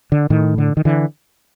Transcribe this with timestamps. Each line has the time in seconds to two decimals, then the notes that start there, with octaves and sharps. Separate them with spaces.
0.12 D3
0.30 A2 D#3
0.58 D3
0.77 D#3
0.85 D3 E3